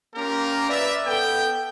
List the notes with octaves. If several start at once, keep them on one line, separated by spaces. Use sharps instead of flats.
A#3 C#4 F4 G4 A#4
B4 D5 E5
B3 A4 G5